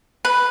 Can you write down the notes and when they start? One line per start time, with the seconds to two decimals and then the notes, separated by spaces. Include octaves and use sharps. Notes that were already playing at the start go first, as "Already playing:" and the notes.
0.25 B4